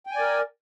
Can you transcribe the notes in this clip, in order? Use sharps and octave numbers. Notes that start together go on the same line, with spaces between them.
A#4 D5 G5 G#5